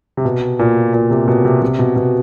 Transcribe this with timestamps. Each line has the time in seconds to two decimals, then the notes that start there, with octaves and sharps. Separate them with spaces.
0.17 C3
0.25 B2
0.59 A#2
0.94 A#2
1.10 C3
1.28 B2
1.45 C3
1.62 C3
1.79 B2
1.96 B2